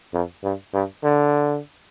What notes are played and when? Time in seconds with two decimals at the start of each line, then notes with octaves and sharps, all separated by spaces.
0.13 F2
0.44 G2
0.74 G2
1.04 D3